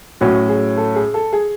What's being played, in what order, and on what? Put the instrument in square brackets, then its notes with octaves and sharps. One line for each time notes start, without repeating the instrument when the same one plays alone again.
[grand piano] A2 F#3 C#4 [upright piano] F#4
[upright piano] G#4
A4
G#4
A4
G#4